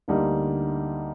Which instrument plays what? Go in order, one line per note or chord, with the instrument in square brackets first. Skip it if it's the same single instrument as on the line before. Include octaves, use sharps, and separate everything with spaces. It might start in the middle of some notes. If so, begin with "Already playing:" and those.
[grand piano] D2 D3 G3 A#3 D#4